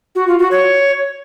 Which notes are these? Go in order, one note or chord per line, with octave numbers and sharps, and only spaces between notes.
F#4
F4
F#4
C#5